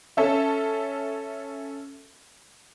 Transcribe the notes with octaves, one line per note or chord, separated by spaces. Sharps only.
C#4 A4 E5